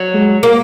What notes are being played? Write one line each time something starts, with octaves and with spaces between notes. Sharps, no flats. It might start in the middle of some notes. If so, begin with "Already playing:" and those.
Already playing: F#3
G#3
A#3